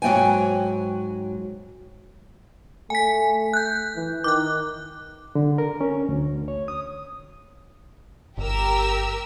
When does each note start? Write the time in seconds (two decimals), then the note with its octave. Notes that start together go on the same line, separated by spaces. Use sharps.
0.02 G#2 F#3 A3 G5 G#5
2.90 A3 G#5 B6
3.53 F#6 G6
3.96 E3
4.24 D#3 D6 F#6
5.35 D3
5.58 A#4
5.81 C#4
6.09 D2
6.48 C#5
6.68 D#6
8.38 G1 G4 A#4 E6